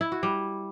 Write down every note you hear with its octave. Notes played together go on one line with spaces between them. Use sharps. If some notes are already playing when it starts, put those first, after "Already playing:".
E4
F#4
G3